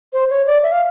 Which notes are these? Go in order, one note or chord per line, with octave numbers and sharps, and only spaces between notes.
C5
C#5
D5
E5
F5